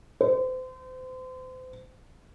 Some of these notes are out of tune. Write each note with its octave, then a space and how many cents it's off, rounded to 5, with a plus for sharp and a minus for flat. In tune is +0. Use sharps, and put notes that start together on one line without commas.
C5 -35